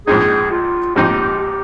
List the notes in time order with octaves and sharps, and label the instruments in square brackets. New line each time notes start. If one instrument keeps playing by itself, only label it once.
[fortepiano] A#1 G#2 F3 C4 D#4 [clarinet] G#4
[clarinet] F4
[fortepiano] A#1 G#2 F3 C4 D#4 [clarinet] G4
[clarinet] G4